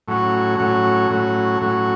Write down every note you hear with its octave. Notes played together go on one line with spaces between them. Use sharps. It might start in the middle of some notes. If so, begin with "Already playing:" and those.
A2 F#3 C#4 F#4
A2 F#3 C#4 F#4
A2 F#3 C#4 F#4
A2 F#3 C#4 F#4